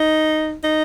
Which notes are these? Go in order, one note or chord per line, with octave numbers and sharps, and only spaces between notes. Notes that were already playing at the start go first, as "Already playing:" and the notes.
Already playing: D#4
D#4